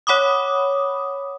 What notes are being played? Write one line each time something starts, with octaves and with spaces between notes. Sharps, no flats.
C#5 F#5 B5 D6 D#6